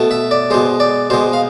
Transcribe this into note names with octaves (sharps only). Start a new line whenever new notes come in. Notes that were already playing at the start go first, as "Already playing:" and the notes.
Already playing: B2 A3
E5
D5
B2 G#3 C5
D5
B2 G#3 C5
F5